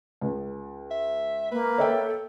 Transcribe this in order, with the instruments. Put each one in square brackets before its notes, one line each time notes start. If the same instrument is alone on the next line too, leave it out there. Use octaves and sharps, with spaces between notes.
[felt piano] C#2
[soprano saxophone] E5
[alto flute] A#3 [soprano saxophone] B4
[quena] A4 [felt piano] C#5 E5 G5